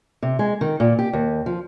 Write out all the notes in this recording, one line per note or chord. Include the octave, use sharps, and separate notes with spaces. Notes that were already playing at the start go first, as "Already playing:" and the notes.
C3
G#3
D#3
A#2
G4
D#2
F3